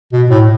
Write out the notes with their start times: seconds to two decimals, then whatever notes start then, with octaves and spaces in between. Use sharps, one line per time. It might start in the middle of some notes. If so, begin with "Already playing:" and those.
0.13 B2
0.31 A2